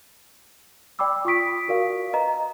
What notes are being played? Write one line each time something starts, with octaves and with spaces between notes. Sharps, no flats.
D5 G5 B5 D6 E6
F4 G5 C#6 D#6 B6 D7
F#4 A#4 D5 F5
B4 D#5 A#5